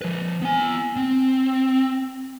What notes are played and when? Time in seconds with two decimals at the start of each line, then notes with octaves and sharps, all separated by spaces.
0.02 F3 B4
0.42 B3 G#5
0.96 C4